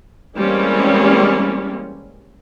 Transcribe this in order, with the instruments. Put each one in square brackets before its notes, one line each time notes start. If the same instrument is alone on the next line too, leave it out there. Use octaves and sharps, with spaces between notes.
[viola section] E3 G3 G#3 A#3 C4 C#4